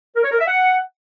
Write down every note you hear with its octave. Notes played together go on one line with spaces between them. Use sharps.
A#4
C#5
A#4
E5
F#5